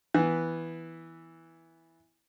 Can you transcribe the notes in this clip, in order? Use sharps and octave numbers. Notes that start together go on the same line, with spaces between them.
E3 B3